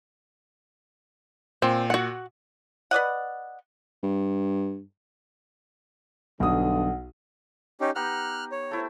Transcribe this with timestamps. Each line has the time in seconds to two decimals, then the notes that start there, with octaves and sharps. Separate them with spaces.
1.62 A#2 C4
1.90 F#4 F#5
2.91 B4 D5 D#5 F#5
4.03 G2
6.40 B1 G2 D3 F#5 D#6
7.81 C#4 D#4 G4
7.95 B3 D#4 G4 F6 F#6
8.52 C#5
8.71 A3 E4 C5